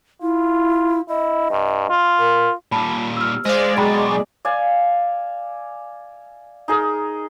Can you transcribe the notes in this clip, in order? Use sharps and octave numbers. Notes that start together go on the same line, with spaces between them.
E4 F4
E4 D#5
G2
F4
A#4
A#2 G3 A5 B5
E6 F6
G#3 C5 D5 D#5 F5
B2 F#3 G#4 G5 A#5 B5
D5 E5 F5 G#5
D#4 G#4 A#4